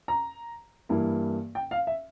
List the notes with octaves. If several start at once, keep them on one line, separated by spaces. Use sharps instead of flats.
A#5
G2 E3 A#3 E4
G5
F5
E5